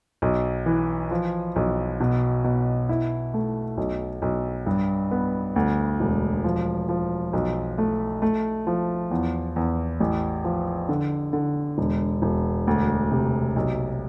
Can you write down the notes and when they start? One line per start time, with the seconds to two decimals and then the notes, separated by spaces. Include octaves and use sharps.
0.22 B1
0.66 E3
1.11 F3
1.56 B1
2.00 B2
2.44 B2
2.89 E4
3.34 A3
3.77 B1
4.22 B1
4.67 G2
5.11 B3
5.56 D2
6.00 E1
6.44 F3
6.89 F3
7.33 B1
7.78 A3
8.22 A3
8.67 F3
9.11 E2
9.56 E2
10.00 A1
10.44 F3
10.89 D3
11.33 D3
11.78 E1
12.22 E1
12.67 D2
13.11 C3
13.56 B1